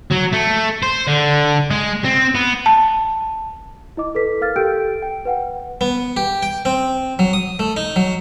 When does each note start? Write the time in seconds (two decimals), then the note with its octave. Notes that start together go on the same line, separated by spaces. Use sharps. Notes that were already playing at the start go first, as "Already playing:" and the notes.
0.11 F#3
0.32 A3
0.82 C5
1.07 D3
1.71 G#3
2.04 C4
2.35 B3
2.66 A5
3.97 E4 D#5 D6
4.15 A4 B4 B6
4.41 A#4 F5 F6 A6
4.56 G4 A4 G5 E6 G6 D7
5.02 G5
5.25 B4 F#5 G5
5.81 B3
6.17 G4
6.42 G5
6.65 C4
7.19 F#3
7.33 D#6
7.59 A3
7.77 D#4
7.96 F#3